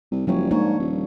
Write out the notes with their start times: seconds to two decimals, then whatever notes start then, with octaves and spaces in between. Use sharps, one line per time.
0.11 C2
0.27 F#1 F3 G3 C#5
0.51 G#2 A#3 D4 C#5
0.79 D#1